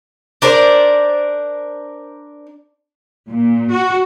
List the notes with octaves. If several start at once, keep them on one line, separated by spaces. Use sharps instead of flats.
D4 A#4 C5 D5
A#2
F#4